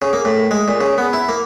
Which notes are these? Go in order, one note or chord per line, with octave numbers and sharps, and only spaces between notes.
C#3
A#3
A2
G#3
A#2
C#3
B3
E4
A#3